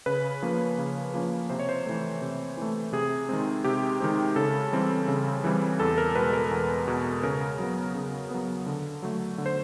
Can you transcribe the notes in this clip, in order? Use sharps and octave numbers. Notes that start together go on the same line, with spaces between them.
C#3 B4
F3 A#3 C#4
C#3
F3 A#3 C#4
C3 C5
C#5
C5
E3 A3
C3
E3 A3
C3 G#4
D#3 G#3 C4
C3 G4
D#3 G#3 C4
C#3 A4
E3 G3 C4
C#3
E3 G3 C4
E2 A4
A#4
B2 G#3 B4
A#4
E2
B2 G#3
C#3 A#4
F#3 B3
C#3
F#3 B3
D3
F#3 A3
D3
C5